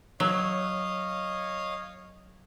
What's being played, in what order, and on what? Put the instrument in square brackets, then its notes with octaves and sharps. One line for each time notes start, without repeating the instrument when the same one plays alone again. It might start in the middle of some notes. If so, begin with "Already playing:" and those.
[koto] F#3 [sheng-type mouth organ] C#5 D#5 F5